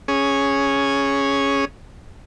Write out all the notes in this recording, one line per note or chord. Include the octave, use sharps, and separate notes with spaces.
C#4 G#4